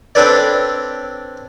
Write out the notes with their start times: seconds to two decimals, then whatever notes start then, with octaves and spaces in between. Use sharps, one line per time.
0.15 C4 D4 A4 B4 C#5 D5